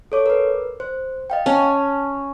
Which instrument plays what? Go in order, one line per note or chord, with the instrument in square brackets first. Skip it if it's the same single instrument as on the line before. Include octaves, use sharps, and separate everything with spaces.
[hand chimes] A4 C#5 D6
A#4 B4
C5
D#5 F5 G5
[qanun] C#4 [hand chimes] A5